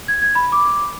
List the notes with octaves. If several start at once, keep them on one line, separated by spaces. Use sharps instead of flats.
G#6
G#6
B5
D6